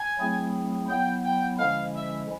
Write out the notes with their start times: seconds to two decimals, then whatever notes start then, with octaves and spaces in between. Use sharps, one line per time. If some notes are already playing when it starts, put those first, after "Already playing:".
Already playing: G#5
0.19 F#3 A3 C4 E4 G#4
0.89 F#3 B3 E4 G5
1.25 G5
1.59 D3 F3 G#3 C#4 E4 F5
1.95 E5